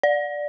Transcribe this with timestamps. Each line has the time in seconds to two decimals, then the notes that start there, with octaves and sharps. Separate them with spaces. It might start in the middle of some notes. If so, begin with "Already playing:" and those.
0.03 D5